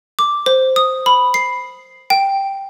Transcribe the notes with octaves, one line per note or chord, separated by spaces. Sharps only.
D6
C5
D#6
B5
C7
G5